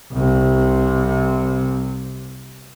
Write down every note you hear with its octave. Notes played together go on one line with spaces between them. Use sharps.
C2 C3